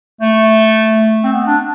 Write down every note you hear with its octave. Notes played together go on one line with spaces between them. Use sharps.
A3
C4
B3
D4